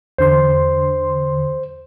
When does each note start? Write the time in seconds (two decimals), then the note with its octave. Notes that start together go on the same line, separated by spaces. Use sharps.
0.18 E2 D3 C5 C6